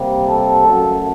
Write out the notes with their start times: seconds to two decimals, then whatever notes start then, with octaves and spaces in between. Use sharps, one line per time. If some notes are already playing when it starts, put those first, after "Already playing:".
Already playing: C3 G3 A#3
0.28 A4
0.65 F#2 F#3 A3